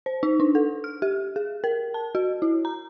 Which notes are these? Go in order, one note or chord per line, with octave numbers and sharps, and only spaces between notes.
C5
D#4
D4
A4
F6
G4
G#4
A#4
A5
F#4
E4
A#5